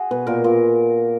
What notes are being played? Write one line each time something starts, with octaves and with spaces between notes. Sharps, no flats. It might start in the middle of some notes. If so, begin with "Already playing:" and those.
Already playing: F#4 G#4
B2 B4
A#2 A#4
A#2